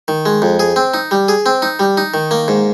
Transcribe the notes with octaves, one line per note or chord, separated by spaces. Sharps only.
D#3
G#3
F2
G#4
C4
D#4
G3
G#4
C4
D#4
G3
D#4
D#3
A#3
G#2